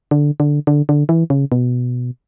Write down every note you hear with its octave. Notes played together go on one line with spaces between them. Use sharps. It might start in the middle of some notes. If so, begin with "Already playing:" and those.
D3
D3
D3
D3
E3
C#3
B2